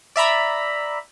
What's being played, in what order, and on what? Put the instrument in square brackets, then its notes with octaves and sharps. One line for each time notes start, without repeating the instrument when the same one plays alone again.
[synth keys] D5 E5 A#5 B5